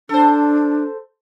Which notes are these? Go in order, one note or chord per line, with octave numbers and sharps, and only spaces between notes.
D4 A4 C5